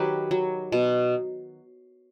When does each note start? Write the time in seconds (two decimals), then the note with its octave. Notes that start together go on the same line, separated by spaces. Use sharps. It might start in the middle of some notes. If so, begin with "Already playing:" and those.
Already playing: D#3 F#3 G4 B4 D#5
0.31 F#3
0.72 B2